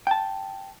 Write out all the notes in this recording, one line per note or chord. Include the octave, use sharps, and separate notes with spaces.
G5 A5